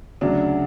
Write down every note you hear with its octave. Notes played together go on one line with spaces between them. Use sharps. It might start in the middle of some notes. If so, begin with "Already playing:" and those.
D2 C#3 F#3 D4